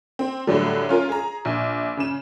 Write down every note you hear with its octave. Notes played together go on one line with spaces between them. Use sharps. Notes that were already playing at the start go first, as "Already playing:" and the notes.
C4
A2 D3 F#3 G3
C#4 F4 A#4
G#4 A#5
A#1
C#3 E7